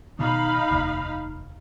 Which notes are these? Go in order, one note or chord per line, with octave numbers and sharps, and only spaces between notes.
B2 D#3 B3 D#4 F5 B5
F1 D#2